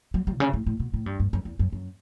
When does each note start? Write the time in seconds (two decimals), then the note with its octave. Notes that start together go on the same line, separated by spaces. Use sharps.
0.14 F#3
0.27 G3
0.35 B2
0.40 C#3
0.53 A2
0.66 A2
0.80 B2
0.94 A2
1.06 G2
1.20 G2
1.33 F#2
1.45 E2
1.59 F#2
1.73 F#2